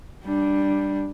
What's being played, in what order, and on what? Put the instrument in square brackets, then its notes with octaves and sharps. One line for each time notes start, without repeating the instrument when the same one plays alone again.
[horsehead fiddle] G3 D4